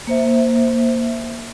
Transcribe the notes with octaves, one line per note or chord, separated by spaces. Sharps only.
A#3 C5 E5